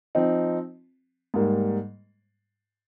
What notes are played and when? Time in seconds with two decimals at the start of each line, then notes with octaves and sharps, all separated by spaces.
0.15 F3 C4 D#4
1.34 G#2 G3 A#3